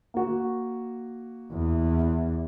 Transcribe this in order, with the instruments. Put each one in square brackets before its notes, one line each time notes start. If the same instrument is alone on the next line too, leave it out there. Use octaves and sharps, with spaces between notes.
[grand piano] A#3 F#4
[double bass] E2